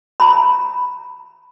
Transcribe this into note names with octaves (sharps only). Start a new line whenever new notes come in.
A#5 B5